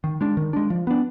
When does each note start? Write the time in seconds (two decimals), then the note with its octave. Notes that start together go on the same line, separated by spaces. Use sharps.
0.04 D#3
0.21 G#3 D4
0.37 D#3
0.53 G#3 D4
0.70 F3
0.87 B3 D4